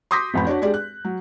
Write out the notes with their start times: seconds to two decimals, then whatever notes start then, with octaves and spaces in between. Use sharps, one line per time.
0.11 C6 D6 D#6 G6 A#6 B6
0.34 A1 F2 B5
0.47 D4 F#4 C#5 D5
0.61 G#3 D4 G4 G#4 D5
0.74 F#6
1.05 F#3